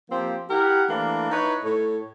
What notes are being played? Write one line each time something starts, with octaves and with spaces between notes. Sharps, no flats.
F3 A#3 C4 G4
E4 G4 A#4 F#5
E3 A3 A#3 D4
D#4 E4 B4 C#5
A2 A4 C#5